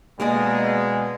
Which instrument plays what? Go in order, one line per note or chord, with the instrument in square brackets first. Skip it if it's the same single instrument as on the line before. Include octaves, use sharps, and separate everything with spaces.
[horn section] B2 G#3 [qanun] A#3 G#4 D5